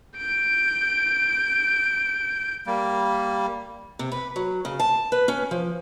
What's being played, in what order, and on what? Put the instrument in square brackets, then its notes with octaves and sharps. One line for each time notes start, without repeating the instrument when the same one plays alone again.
[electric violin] G6 D7
[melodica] G3 A#3
[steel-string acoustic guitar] C3
B4
F#3
C#3
A5
B4
C#4
F3